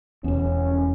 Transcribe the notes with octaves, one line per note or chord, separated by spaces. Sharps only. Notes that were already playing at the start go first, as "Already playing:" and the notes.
E1 E2 C#4